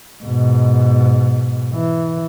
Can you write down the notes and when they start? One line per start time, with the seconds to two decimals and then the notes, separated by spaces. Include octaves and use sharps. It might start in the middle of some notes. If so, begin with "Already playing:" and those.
0.24 G#2 B2
1.73 E3